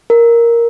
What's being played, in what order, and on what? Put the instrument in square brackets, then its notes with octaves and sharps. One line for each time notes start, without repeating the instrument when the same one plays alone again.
[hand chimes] A#4